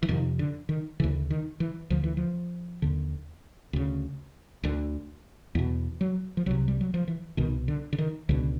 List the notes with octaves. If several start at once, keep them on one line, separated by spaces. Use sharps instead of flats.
E3
F2 C3 D#3
D3
D#3
D2 C#3 E3
D#3
E3
D2 D3 F3
E3
F3
D#2 D3
D2 C#3
D2 D3
E2 B2
F#3
F3
C2 C3 F#3
G3
F#3
F3
E3
C2 B2 D#3
D3
D3
D#3
C#2 B2 D3